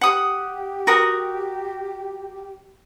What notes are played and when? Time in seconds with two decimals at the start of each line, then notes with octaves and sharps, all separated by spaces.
0.01 G4 F#5 D#6
0.87 F#4 A#4 D#6